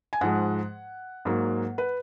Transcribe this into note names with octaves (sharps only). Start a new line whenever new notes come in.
G#5
G#2 F3 G#3 F#5
G#2 F#3 A#3
B4